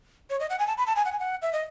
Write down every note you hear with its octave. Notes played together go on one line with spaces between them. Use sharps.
C#5
D#5
F#5
G#5
A5
B5
A5
G#5
F#5
G#5
F#5
E5
D#5